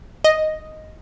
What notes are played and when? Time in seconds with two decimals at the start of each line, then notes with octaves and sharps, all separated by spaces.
0.24 D#5